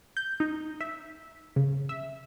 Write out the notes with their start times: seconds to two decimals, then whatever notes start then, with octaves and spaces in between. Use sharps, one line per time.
0.17 G6
0.40 D#4
0.81 E5
1.56 C#3
1.89 E5